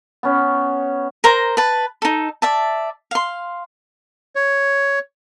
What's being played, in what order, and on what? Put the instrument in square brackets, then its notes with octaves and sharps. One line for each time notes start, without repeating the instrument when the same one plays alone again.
[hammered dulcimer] B3 C#4
[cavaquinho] A#4 C5 A#5
B4 A5
D#4 A4
D5 E5 A5
F5 C6
[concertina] C#5